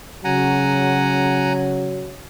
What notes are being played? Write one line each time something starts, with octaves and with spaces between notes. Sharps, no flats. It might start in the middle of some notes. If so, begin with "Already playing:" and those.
C#3 F#3 F#5 G#5 A#5